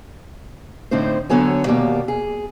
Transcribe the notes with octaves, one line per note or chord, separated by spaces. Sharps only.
A2 D3 C4 D#4 C5
D3 F#3 B3 A4 C#5 G#5
D#2 B2 E3 A#3 G4 D5
G#4